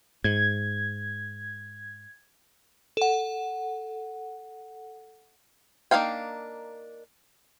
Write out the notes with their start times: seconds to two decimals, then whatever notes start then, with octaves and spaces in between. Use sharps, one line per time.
0.24 G#2 G#6
2.97 A4 F#5
5.91 A#3 D4 D#4 F5 G5